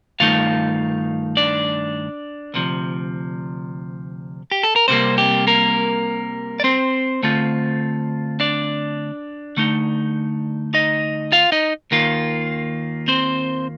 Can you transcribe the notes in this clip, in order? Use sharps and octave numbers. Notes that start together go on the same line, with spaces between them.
G2 D#3 A3 D#4 F4 F5
D4 D5
D2 C3 F3
G4
A4
A#4
C2 C3 G3 A#3 C4 C5
G4
A#3 A#4
D5
C4 C5
D3 A3 C4 F4
D4 D5
D3 A3 D#4
D#4 D#5
F4 F5
D#4 D#5
D#2 D#3 A#3 F4
C4 C5